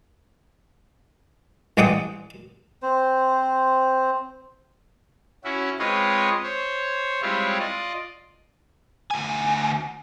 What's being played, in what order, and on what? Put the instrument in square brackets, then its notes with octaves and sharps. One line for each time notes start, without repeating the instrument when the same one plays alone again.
[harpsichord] A1 G#3 D5 F#5 G5 D#6
[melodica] C4 C5
[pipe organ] C#4 E4 F#4
G#3 C4 F4 B4 C#5 D#5
C5 C#5
G3 G#3 C4 E4 F4 C#5
F4 D5 D#5
[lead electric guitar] D2 G#5